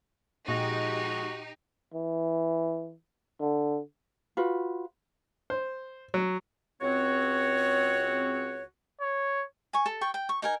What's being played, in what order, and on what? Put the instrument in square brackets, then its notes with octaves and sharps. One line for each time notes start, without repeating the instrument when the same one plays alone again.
[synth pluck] A#2 [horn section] F3 G#3 [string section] D#4 G4 [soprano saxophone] F#4
[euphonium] E3
D3
[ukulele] F4 F#4 B4
[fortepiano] C5
F#3
[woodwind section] C#2 C4 F#4 C#5
[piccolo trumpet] C#5
[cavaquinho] G#5 C#6
A4
G5 C#6
G5
C#6
D#4 A#4 G#5